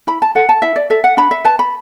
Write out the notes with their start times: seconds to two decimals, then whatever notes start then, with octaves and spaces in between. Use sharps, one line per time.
0.07 E4 B5
0.22 A5
0.35 A4 F#5
0.49 A5
0.62 E4 E5
0.76 D5
0.90 A4 E5
1.04 F#5
1.17 D4 B5
1.31 E5
1.45 B4 A5
1.59 B5